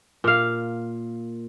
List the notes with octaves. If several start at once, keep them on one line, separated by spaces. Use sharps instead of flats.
A#2 F5